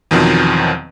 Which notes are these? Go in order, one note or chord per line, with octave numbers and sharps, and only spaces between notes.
E2 B2 D#3 F3 F#3 C4